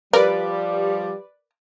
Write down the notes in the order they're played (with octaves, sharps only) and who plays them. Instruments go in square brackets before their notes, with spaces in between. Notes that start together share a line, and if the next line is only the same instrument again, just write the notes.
[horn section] F3 G3 [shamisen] A#4 [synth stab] B4 D5